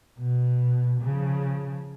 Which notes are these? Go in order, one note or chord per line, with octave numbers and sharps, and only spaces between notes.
B2
C#3 F3